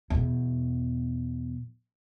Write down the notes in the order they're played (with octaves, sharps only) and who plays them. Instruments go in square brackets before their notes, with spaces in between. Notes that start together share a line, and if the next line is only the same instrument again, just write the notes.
[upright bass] E2 B2